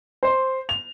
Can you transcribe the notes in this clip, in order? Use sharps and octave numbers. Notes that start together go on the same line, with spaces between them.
C5
F7